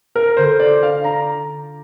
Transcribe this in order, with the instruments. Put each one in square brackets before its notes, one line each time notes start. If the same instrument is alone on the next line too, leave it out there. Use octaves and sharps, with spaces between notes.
[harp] F4 [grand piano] A#4
[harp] D3 [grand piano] C5
[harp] F4 [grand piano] D5
[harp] D4 [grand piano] F5
[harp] D4 [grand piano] A#5